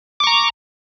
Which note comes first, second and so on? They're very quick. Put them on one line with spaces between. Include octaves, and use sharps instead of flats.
D6 C#6 A#5